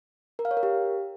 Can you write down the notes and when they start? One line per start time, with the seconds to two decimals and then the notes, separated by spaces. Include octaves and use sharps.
0.39 A#4
0.45 F5
0.51 C#5
0.57 A#4
0.63 G4